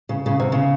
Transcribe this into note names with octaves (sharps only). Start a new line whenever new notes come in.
C#3
C#3
C3
C#3